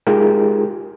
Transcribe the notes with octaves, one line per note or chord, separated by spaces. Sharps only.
G#3 D#4 F4 G4 G#4 A#4